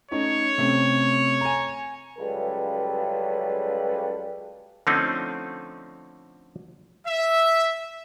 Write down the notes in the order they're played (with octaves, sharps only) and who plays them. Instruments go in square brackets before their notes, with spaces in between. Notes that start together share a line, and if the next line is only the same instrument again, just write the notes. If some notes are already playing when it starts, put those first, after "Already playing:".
[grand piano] A3 C#4 D#4 [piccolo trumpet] C#5
[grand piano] C3 A3 C#4
G#5 A#5
[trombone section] C#2 C#3 F#3 G3 A4 B4
[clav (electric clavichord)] D3 F3 A3 C4 C#4 D#4
[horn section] E5